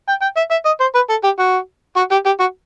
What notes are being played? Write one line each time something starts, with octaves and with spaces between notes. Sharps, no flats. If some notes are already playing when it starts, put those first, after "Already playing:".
G5
G5
E5
E5
D#5
C5
B4
A4
G4
F#4
F#4
G4
G4
F#4